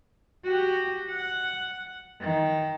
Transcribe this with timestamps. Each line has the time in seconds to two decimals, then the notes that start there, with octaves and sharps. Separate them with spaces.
0.44 F#4 G4
1.10 F#5
2.21 D#3